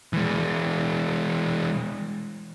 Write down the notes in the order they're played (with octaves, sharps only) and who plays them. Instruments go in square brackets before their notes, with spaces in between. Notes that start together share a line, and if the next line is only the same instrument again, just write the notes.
[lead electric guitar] E3 G#3